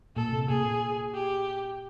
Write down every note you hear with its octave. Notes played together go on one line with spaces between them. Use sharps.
A#2 A4
C3
A#2 G#4
G4